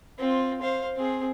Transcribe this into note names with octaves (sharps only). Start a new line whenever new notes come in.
C4 F4
C5 F5
C4 G#4